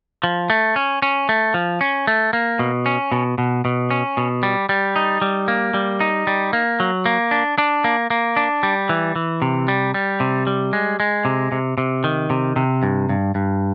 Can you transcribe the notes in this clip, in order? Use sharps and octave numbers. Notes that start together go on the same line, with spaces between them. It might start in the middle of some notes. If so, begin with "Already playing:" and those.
F3
A3
C#4
C#4
A3
F3
C#4
A3
A#3
B2
C#4
B2
B2
B2
C#4
B2
G3
G3
D#4
G3
A#3
G3
D#4
G3
A#3
F#3
A#3
D4
D4
A#3
A#3
D4
G3
E3
E3
C3
G3
G3
C3
G3
G#3
G#3
C3
C3
C3
D#3
C3
C3
G2
G2
G2